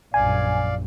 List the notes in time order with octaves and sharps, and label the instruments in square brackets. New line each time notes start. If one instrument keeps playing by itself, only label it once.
[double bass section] A#1 F#2 [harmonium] D5 F5 [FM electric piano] G#5